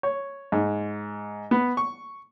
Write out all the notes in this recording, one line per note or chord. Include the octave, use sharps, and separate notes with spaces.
C#5
G#2
B3
C#6